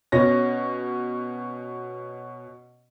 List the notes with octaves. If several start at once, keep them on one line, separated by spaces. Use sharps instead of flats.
B2 C#4 A#6